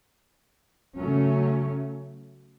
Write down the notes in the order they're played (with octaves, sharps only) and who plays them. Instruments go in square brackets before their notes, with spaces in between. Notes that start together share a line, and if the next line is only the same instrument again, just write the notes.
[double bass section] C#3 F#3 A3 C#4